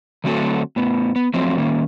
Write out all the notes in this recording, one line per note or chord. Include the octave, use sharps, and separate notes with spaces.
D3 F#3 A3 C4 F#4 A4
A2 B3
B3
F3 F#3 A3 C4
D#3 A#3 C#4